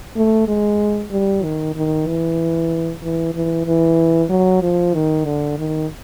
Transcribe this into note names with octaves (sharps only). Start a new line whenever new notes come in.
A3
G#3
G3
D#3
D#3
E3
E3
E3
E3
F#3
F3
D#3
D3
D#3